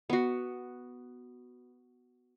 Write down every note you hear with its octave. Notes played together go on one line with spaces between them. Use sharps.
B3 F#4